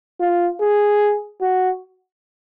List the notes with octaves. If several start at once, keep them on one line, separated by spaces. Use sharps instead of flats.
F4
G#4
F#4